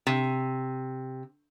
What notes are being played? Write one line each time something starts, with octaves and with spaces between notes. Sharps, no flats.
C3